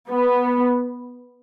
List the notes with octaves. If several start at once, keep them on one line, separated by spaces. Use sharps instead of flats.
B3